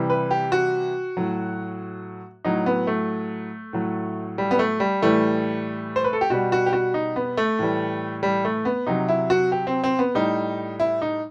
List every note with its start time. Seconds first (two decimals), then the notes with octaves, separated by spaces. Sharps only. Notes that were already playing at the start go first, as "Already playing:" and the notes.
Already playing: C3 E3 G3
0.10 B4
0.31 G4
0.52 F#4
1.17 A2 F#3
2.45 A2 F#3 D#4
2.66 B3
2.87 A3
3.73 A2 F#3
4.38 G3
4.51 B3
4.59 A3
4.80 G3
5.02 A2 E3 G3 A3
5.96 C5
6.04 B4
6.13 A4
6.21 G4
6.30 B2 G3 F#4
6.52 F#4
6.66 G4
6.73 F#4
6.94 D#4
7.16 B3
7.37 A3
7.59 A2 E3 G3
8.23 G3
8.45 A3
8.65 B3
8.87 C3 F#3 D#4
9.09 E4
9.30 F#4
9.52 G4
9.67 C4
9.84 C4
9.99 B3
10.15 A2 G3 D#4
10.80 E4
11.02 D#4